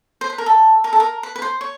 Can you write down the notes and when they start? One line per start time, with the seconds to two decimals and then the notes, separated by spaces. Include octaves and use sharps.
0.21 C5
0.30 B4
0.38 A#4
0.46 A4
0.84 A#4
0.93 A4
1.00 A#4
1.23 B4
1.36 B4
1.42 C5
1.61 C#5